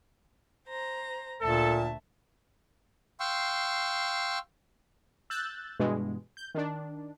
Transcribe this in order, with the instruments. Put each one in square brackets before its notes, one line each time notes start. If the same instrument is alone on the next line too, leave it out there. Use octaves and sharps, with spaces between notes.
[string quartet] C5 A#5
[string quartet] D2 E5 A5 [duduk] A#2 [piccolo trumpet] A4
[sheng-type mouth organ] F5 G5 C6 C#6 E6
[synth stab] E6 F#6 G6 A6
G2 B2 E3 G#3
G6
D#3 D4